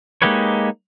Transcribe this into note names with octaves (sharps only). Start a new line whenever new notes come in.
G#3 A#3 D#4 G4 B4 C#5